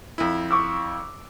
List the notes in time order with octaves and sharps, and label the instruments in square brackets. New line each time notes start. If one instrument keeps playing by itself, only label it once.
[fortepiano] F2 E4
[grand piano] C#6 D6 E6